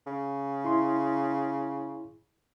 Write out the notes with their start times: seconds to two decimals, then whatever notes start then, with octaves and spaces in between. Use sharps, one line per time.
0.06 C#3
0.65 E4 C6